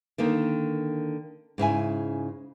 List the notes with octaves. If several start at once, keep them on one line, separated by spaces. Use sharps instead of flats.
D3 D#3 A#3 D#4
G#2 C#3 E4 G#5